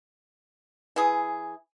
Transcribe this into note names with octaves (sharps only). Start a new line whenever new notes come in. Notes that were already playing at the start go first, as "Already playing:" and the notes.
E3 G#4